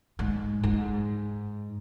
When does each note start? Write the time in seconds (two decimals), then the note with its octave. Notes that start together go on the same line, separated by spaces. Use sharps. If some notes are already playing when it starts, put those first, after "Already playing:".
0.19 G#2
0.63 G#2